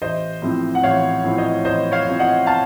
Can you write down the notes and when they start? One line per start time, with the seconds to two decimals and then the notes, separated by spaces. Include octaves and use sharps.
0.01 A1 C5 D#5
0.42 A2 F3 C4
0.75 F#5
0.83 A1 C#5 F5
1.24 A2 F3 C4
1.38 C5 D#5
1.64 A1 C5 D#5
1.92 C#5 F5
2.06 A2 F3 C4
2.19 D#5 F#5
2.46 F5 A5